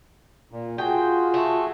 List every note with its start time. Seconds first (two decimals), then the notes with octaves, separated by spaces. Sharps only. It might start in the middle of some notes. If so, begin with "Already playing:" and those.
0.52 A#2
0.78 F4 F#4 G#4 G5
1.34 A3